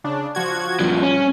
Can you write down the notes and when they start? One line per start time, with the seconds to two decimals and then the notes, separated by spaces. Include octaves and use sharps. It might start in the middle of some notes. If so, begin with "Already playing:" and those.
0.04 C#3 D4
0.35 F3 F#4 G#6
0.80 A#1 G2 F3
1.02 C#4